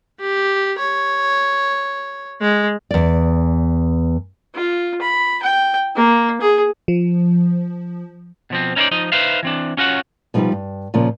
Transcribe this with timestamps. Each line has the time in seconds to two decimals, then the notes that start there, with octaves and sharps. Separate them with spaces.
0.20 G4
0.79 C#5
2.41 G#3
2.91 E2 D5
4.54 F4
5.01 B5
5.42 G5
5.95 A#3
6.41 G#4
6.88 F3
8.50 B2 F3 C4
8.76 C#4 D#4 E4 B4 C5 D5
8.91 F3 D#4 D#5
9.12 D#4 B4 C5 E5 F5
9.43 E3 C4 D4
9.77 C#4 F4 F#4 C#5 F#5
10.34 B2 F3 G3 D#4 F4 B4
10.52 G2
10.94 A#2 C#3 F3 A#3